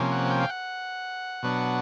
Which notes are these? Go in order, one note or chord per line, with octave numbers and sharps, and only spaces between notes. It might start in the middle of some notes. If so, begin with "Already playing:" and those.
Already playing: C3 F3 A#3 C#4
F#5
G5
F5
F#5
B2 F#3 B3 D4